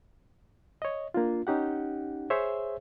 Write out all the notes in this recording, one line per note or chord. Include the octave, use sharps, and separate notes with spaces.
C#5 D#5
A#3 D4 F4
C#4 D#4 G4 F#5
G#4 C5 C#5 E5